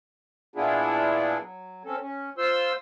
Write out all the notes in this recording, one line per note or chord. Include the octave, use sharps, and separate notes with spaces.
A#2 B3 D4 E4 F4 G#4
F#3
C4 C#4 A4
C#4
F4 C5 C6 E6